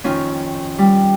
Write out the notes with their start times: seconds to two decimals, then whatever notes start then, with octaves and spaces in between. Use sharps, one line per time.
0.04 F2 D#3 C#4 F4
0.78 G3